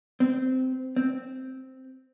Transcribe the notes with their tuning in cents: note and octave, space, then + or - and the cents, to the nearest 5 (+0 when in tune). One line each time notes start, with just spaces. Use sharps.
C4 -15
C4 -5